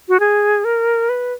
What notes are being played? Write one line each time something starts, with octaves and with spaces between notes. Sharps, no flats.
F#4
G#4
A#4
B4